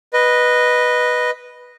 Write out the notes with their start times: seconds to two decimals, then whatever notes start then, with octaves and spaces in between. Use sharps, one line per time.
0.13 B4 D#5